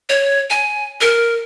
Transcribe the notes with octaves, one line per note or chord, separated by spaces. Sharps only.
C#5
G#5
A#4